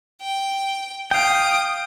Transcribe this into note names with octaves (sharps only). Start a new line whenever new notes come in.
G5
F5 G5 D#6 D7